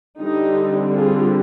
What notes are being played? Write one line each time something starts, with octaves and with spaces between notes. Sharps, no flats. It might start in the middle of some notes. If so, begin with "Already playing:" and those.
D3 G3 C4 D#4 G4
F4 G#4